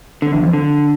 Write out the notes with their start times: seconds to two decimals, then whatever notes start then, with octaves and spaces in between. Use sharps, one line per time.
0.22 D3
0.33 E2
0.43 F2
0.53 D3